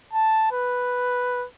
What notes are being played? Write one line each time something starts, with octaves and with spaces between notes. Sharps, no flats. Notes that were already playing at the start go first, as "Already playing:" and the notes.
A5
B4